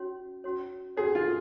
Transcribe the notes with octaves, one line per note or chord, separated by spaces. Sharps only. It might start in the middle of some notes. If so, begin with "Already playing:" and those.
Already playing: C#4 F#4 C#5
C#4 F#4 C#5
C#4 F#4 G#4 C#5
F4